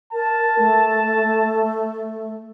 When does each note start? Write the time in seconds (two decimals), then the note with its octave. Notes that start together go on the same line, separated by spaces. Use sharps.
0.13 A#4 A5
0.59 A3